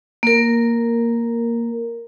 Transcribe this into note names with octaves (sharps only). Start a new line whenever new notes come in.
A#3 A#4